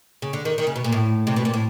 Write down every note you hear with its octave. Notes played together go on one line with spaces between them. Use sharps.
C#3
D3
D#3
D#3
C#3
B2
A#2
A2
C3
B2
A#2
A2